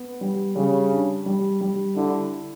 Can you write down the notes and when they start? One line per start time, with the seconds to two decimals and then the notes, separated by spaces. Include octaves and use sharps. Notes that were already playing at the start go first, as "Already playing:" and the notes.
Already playing: B3
0.21 G3
0.56 C#3 G3
0.91 D4
1.26 G3
1.61 G3
1.96 D3 E4